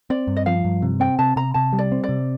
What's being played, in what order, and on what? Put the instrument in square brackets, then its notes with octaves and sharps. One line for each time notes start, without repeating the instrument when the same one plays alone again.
[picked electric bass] C4 [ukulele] D5
[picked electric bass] G2
[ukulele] D#5
[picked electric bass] F3 [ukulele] F5
[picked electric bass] G2
C3
[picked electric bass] C4 [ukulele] G5
[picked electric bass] C3 [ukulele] A5
[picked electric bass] C3 [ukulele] A#5
[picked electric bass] C3 [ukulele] A5
[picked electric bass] G3
[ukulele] D5
[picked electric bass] C4
[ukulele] D5
[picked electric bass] C3